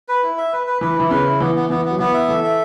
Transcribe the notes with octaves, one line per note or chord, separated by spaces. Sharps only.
B4
E4
E5
B4
B4
E3 B4
E3 E4
C#3 B4
E4
E3 B3
B3
E3 B3
F#3 B3
E3 B3
E5
E3 A4
E5